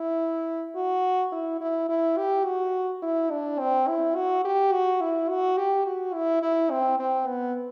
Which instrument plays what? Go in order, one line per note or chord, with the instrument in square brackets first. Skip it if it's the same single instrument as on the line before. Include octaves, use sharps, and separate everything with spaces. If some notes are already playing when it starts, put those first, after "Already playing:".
Already playing: [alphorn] E4
F#4
E4
E4
E4
G4
F#4
E4
D4
C4
E4
F#4
G4
F#4
E4
F#4
G4
F#4
E4
E4
C4
C4
B3